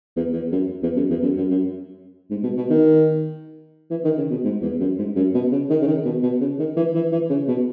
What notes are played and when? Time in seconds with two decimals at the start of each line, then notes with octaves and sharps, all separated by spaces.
0.16 E2
0.33 E2
0.52 F#2
0.83 E2
0.96 F#2
1.10 E2
1.23 F#2
1.37 F#2
1.50 F#2
2.30 G#2
2.43 B2
2.57 B2
2.70 D#3
3.90 E3
4.04 D#3
4.17 C#3
4.31 B2
4.45 G#2
4.62 E2
4.80 F#2
4.98 G#2
5.16 F#2
5.34 B2
5.52 C#3
5.70 D#3
5.82 C#3
5.87 D#3
6.05 B2
6.23 B2
6.41 C#3
6.59 D#3
6.77 E3
6.95 E3
7.12 E3
7.30 C#3
7.48 B2